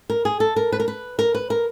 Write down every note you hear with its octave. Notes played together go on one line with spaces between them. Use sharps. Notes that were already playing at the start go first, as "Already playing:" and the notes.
A#4
G#4
A4
A#4
B4
A#4
B4
A#4
B4
A#4